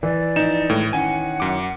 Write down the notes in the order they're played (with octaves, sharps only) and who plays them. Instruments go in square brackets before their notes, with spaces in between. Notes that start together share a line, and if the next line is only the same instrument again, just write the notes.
[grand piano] E3 [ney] D5
[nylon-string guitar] F3 E4 [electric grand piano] D#4 E7
[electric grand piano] A2 [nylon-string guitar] D#3 G#3 A3
[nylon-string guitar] D#3 C#4 E4 [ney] F#5 [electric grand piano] G#5
[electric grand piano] F#2 D6